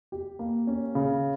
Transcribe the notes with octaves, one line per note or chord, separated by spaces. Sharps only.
G4
A#3
C#4
C#3